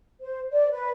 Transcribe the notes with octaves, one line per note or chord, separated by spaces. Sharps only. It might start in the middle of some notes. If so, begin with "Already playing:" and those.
C5
D5
B4